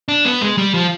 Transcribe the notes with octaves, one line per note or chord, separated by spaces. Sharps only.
D4
B3
G#3
G3
F3